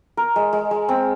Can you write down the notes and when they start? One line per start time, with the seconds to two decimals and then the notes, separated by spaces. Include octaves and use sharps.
0.17 A#4
0.36 G#3
0.53 G#3
0.71 G#3
0.89 C4